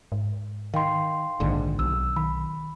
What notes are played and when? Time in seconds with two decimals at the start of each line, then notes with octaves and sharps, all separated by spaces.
0.12 G#2
0.74 D#3 F5 G5 C6
1.40 A#1 G#2 D3 D#3
1.79 B1 E6
2.16 D#3 B5